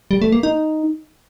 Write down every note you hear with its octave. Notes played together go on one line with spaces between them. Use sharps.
G3
A3
A#3
D#4